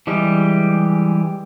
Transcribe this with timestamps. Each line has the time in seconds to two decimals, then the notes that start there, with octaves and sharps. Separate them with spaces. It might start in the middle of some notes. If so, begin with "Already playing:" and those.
0.07 E3 G3 G#3 G4